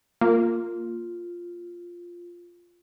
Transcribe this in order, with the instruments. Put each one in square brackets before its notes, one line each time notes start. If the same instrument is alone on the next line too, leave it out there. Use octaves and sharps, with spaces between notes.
[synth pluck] A#3 [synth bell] F4